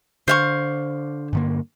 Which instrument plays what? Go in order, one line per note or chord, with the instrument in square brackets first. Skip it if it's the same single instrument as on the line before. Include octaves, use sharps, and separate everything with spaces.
[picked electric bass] D3 [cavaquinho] C5 F5 C#6
[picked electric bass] G2 D3 A#3